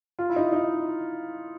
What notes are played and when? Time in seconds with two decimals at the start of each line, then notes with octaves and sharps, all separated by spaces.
0.19 F4
0.30 E4
0.36 D#4
0.52 D#4